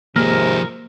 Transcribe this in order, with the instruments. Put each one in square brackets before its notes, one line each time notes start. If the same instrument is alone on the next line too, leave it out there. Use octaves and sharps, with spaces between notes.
[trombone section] D#2 G#2 C3 [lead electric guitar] F3 G#4 [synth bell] A#3 [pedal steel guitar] A#4